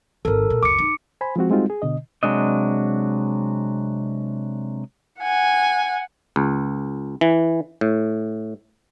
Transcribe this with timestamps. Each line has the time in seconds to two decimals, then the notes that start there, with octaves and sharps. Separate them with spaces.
0.25 G#1 D#3 A4 A#4
0.50 A#2
0.63 F#1 D2 D6 C#7
0.79 D#4
1.21 C5 G#5 B5
1.36 F3 G#3 C4 F#4
1.50 G3 G#3 C4 D#4 F4 F#4
1.70 G#4
1.82 B2 D3 D#5
2.23 C3 F#3 G#3 D4 D#5
5.21 F#5 G#5
6.36 C#2
7.21 E3
7.81 A2